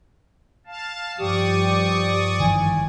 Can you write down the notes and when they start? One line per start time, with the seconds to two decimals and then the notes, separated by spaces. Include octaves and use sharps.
0.67 F5 A5
1.19 G2 F3 G4 D5 C#6 D#6
2.40 G#1 D#3 E3 G#5